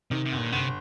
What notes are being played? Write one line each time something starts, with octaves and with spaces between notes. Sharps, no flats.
C3 D#3
C3
G1
A#2
G1 C3